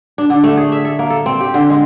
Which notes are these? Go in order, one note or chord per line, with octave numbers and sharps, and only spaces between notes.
D4
D3
A3
G#4
E5
A4
A#3
A4
C4
G4
D3
G#3